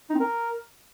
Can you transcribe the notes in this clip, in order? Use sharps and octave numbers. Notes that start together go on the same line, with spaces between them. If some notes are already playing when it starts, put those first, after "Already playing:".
D#4
C4
A#4